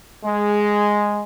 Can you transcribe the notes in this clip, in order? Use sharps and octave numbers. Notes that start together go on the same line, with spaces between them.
G#3